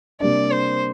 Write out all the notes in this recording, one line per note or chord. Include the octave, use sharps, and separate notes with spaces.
C3 G3 A#3 D4 D5
C5